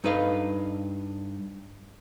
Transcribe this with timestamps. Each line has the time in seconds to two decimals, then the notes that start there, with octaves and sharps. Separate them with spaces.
0.04 G2 D#4 A4 B4 D#5 F5